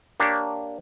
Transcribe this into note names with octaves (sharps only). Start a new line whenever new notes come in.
A#3 D4 G4 C#5